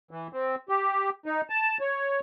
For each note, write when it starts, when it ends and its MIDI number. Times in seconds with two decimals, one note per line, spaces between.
0.11 0.27 52
0.33 0.55 60
0.69 1.10 67
1.26 1.41 63
1.50 1.78 81
1.80 2.20 73